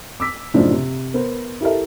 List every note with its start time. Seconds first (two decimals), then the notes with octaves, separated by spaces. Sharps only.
0.20 D6 E6 B6
0.54 F#2 A2 C#3 F3 D4 D#4
0.71 C3
1.14 B3 A#4 C5
1.61 E4 G4 A4 A#4 E5